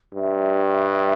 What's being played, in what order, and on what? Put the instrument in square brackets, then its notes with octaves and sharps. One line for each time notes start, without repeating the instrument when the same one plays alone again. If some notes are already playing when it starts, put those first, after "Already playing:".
[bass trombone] G2 [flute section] E5